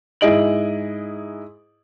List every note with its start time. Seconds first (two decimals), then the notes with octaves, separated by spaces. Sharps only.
0.21 G#2 E4 G#4 D#5 D7 F#7